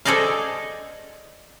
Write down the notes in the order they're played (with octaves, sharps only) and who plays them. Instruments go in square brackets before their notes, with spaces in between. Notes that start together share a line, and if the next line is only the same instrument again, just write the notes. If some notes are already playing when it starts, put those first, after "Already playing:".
[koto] G#4 A4 C5 D5 D#5 F5